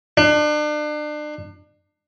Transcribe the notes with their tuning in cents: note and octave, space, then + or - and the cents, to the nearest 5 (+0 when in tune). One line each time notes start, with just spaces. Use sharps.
D4 +35